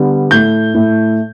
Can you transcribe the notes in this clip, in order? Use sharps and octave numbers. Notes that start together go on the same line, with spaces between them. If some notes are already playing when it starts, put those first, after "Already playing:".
Already playing: D3 G3 B3
A2 A3 G6
A2 A3